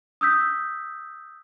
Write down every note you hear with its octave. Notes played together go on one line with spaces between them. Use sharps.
D#6 E6 G6 B6